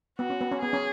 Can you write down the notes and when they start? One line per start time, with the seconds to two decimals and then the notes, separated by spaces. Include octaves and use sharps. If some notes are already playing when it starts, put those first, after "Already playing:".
0.19 B3 F#4
0.30 C#4
0.41 B3
0.52 C#4
0.62 B3 G#4
0.73 C#4